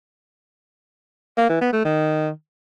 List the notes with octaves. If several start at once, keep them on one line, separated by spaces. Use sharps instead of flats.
A#3
E3
B3
A3
D#3